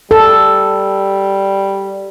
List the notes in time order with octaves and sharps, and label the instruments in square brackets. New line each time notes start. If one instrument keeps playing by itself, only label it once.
[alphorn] G3 [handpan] A4